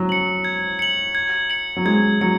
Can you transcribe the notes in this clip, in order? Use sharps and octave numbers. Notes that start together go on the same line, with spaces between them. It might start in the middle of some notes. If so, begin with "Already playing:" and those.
Already playing: F#3
C#7 F#7
G#6
C#7 F#7
G#6
C#7 F#7
F#3
G#3 G#6
F#3 C#7